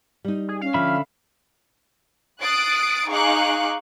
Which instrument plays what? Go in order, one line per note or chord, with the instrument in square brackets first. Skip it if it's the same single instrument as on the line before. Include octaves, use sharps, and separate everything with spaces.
[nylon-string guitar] G3 D#4
[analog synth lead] G#4
[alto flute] C#4 [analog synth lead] F5
[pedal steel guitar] D3 E5 B5 [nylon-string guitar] F3
[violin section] D#6 F#6 A6 C7 D7
D#4 G#4 F5 C#6 D6 F#6